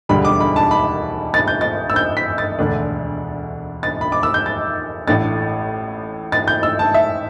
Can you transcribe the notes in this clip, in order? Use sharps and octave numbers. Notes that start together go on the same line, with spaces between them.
E1 D2 D3 G3 B5
D6
B5
A5
B5
A6
G6
A6
E6
G6
B6
A6
E1 D2 D3 A3 D4
A6
B5
D6
E6
G6
A6
A1 A2 A3 D4 A6
A6
G6
E6
A5
E5